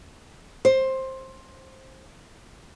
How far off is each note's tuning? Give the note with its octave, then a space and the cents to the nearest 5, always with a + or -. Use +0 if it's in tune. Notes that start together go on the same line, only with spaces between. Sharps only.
C5 +15